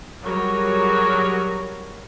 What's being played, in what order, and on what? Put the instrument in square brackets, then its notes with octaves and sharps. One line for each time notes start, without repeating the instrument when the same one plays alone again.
[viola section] F#3 G3 F#4 G#4 A#4 C#5